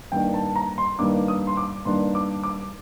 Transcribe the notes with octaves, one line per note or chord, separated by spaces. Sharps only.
G2 D#3 A#3 D4 G5
A5
A#5
C6
G2 D#3 A#3 D4 D6
D#6
C6
D6
G2 D#3 A#3 D4 C6
D6
D6